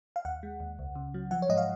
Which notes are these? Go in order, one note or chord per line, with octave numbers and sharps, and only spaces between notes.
F5
D#2 F#5
G#3
D#2
C#2
C#3
F#3
F3 F#5
C#5
G#2 D#5
F5